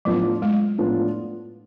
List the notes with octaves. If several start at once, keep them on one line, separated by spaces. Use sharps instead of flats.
A2 F3 F#3 B3 D4 F4
G#3
A2 F3 B3 D4 F4